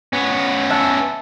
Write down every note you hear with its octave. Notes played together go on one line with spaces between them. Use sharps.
B3 C#4
E5 A5 F#6